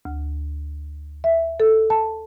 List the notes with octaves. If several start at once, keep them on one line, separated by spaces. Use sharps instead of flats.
D2
E5
A4
A5